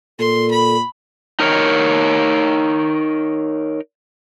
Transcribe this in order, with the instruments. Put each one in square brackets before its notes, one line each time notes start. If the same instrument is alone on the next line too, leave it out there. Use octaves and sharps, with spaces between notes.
[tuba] A#2 [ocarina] A4 [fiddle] C6
[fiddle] B5
[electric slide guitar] D#4 A#4 C#5